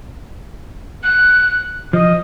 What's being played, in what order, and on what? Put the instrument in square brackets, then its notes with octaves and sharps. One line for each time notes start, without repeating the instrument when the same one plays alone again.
[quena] F#6
[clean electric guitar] F3 [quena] D#5